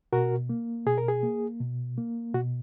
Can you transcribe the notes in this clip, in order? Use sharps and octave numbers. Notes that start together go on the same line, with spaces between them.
B2 F#4 A#4
A#3
B2 G#4
A#4
G#4
A#3
B2
A#3
B2 F#4